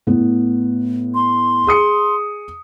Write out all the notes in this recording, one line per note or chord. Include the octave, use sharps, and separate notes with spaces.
A2 B3
C6
G#4 D#6 C#7